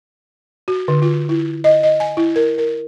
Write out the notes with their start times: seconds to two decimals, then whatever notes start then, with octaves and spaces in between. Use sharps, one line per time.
0.68 F#4
0.88 D3
1.02 F4
1.29 E4
1.64 D#5
1.83 D#5
2.00 G#5
2.17 E4
2.36 A#4
2.58 A#4